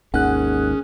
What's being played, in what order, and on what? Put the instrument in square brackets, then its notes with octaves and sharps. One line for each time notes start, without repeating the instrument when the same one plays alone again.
[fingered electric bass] G#1 D#2 D#3 [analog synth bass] C#4 [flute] G#4 [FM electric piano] F#5 F#6